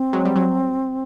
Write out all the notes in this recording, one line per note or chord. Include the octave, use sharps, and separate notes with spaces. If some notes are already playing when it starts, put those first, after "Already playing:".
Already playing: C4
F#3 G#3
G3
F#3